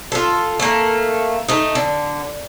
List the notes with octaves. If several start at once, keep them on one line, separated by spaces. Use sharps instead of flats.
F4 A4
A3 A#3
A3 D#4
D3